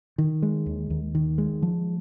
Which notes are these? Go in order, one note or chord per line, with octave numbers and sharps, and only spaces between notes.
D#3
G#3
D#2
D#2
D#3
G#3
F3